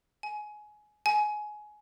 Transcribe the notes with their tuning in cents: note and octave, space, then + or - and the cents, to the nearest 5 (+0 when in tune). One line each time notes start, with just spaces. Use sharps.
G#5 +20
G#5 +20